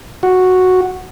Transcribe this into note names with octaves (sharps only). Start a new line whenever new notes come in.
F#4